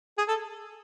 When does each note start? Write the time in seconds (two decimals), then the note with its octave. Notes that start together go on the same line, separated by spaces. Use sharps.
0.18 G#4
0.28 A4